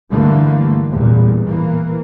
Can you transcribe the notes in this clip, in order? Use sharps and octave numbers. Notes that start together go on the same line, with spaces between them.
G2 D3 E3 G3 A3 A#3
A1 E2 A#2 G3
E3 A#3